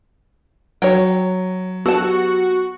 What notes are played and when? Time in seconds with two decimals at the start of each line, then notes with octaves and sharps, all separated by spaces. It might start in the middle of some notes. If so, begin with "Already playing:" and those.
0.82 F#3 C#5 G5
1.86 B3 F#4 G4 A4 A5